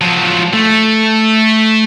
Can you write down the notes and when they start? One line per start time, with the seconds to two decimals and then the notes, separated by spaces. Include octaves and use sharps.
0.01 F3 F#3
0.53 A3